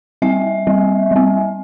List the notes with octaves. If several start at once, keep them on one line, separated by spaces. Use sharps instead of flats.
G3 C4 E5
G3 C4
G3 C4